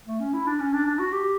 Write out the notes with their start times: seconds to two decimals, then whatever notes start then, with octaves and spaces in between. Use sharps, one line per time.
0.07 A3
0.20 C#4
0.33 E4
0.46 D4
0.60 C#4
0.73 D4
0.86 D4
0.99 F#4
1.12 G4